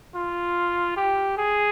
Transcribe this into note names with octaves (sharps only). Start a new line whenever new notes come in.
F4
G4
G#4